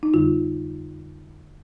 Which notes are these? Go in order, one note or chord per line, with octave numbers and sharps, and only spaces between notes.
D#4
F2 D3 G3 F4